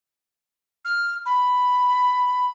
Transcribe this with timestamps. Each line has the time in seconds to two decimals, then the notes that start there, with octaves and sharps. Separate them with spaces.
0.85 F6
1.26 B5